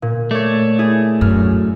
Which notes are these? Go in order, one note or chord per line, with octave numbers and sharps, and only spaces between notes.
A#2
A3 C#5 D5
E4 G#4
F#2 F6